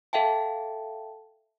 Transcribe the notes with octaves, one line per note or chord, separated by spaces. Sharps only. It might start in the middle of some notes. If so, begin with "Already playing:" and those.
A4 E5 F5 G5 A5